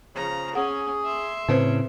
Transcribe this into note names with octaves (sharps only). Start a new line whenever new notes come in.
C#3 F3 A#5
C#4 G#4 F#5
E5 C6
A2 C#3 C4 B4 C5